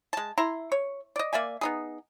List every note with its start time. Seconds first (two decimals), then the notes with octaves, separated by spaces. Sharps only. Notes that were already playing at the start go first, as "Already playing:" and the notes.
0.13 G#3 A5
0.38 E4 A#5 C6
0.72 C#5
1.16 D5 D#5
1.33 A#3 D5 E5 G#5
1.61 B3 D#4 G#4